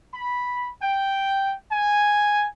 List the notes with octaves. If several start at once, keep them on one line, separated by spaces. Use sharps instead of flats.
B5
G5
G#5